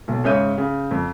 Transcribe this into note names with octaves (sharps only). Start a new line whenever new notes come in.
B1
G#2 C#3 C#5 E5 G6 D#7
C#3
F2